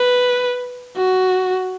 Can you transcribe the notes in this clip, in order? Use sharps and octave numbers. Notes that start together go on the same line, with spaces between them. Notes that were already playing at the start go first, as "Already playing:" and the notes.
Already playing: B4
F#4